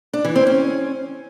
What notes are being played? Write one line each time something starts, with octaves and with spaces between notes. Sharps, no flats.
D4
E3
C4
C#4